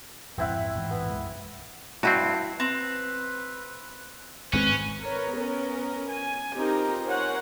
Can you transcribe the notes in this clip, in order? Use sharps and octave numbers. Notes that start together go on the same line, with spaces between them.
A#1 F2 G#2 C4 E4 F#5
A1 G#2 E3
B3
B1 F#2 G#3
G2 C4 E4 F#4
C4 B4
G#1 G#3 C4 C#4 B4
A#4 B4 C#5
B3 C#4 A#4
G#5
C4 D#4 F4 G4 A#4
A#4 C5 C#5 F#5 G#5